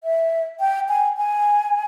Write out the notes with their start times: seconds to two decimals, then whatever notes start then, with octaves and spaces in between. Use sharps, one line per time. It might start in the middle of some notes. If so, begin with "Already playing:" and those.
0.04 E5
0.60 G5
0.89 G#5
1.17 G#5